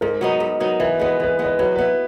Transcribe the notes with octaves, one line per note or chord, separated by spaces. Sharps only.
G#2 A#4
F#3 B3 D#4
G#2
F#3 B3 D#4
E3 B4
G#3 B3 B4
E3 B4
G#3 B3
B4
F#3 B4
B3 E4 B4